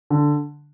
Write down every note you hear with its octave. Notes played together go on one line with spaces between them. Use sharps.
D3